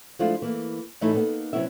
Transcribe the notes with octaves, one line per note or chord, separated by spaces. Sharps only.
F3 G#3 A3 D4 E4 F4
E3 A#3
A2 E3 G3 A3 D#4 E4
A#3 B3 D#4 A4
C3 F#3 B3 C#4 E4 E5